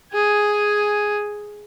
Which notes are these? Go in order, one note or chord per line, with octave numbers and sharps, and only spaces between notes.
G#4 G#5